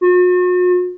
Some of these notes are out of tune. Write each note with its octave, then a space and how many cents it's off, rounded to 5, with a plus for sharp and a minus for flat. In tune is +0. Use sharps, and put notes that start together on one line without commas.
F#4 -45